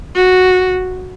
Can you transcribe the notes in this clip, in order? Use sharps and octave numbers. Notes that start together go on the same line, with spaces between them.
F#4